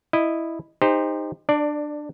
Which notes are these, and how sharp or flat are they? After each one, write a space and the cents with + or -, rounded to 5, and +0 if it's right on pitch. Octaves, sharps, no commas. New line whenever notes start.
E4 +0 D#5 -10
D#4 +0 G4 +40 C5 +0
D4 +20 D5 +0